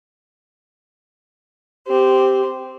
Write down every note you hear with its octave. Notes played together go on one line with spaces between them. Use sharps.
C4 G4